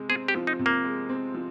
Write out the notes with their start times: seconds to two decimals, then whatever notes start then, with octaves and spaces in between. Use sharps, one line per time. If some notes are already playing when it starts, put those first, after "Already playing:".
Already playing: C3 G#3
0.09 C4 G#4
0.28 G4
0.35 F3
0.47 D#4
0.59 C3
0.66 A#3
0.84 G#3
1.09 C4
1.34 F3